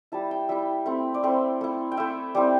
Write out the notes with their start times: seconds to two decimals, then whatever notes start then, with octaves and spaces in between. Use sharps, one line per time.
0.12 G3 E4 A5
0.31 G5
0.49 G3 E4 E5
0.86 A3 C4 E4
1.14 D5
1.23 A3 C4 E4 C5
1.61 A3 E4
1.92 G5
1.97 A3 E4 E5
2.35 G3 C4 E4 D5